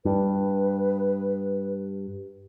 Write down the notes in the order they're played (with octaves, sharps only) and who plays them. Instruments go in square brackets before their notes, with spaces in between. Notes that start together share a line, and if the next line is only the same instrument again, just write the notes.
[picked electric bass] G2 [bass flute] B4